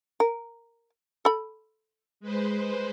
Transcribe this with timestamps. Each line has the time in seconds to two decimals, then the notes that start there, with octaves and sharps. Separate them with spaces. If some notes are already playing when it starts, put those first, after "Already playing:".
0.20 A#4
1.25 A4 B5
2.20 G#3 B4 C5